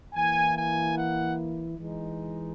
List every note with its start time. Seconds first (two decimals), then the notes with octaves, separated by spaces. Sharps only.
0.14 E3 A#3 E4 G#5
0.56 G#5
0.97 F#5
1.79 E3 G#3 D#4